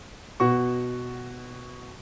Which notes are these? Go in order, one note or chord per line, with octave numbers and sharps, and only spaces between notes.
B2 F#4 C#6